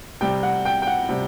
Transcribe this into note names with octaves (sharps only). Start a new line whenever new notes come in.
C3 G3 G5
F#5
G5
G5
F#5
C3 G3